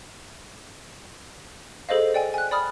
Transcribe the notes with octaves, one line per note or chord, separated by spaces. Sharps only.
G#4 A4 C5 D#5 F5
D5 G5 G#5
G#5 F#6
D5 B5 D#6 F6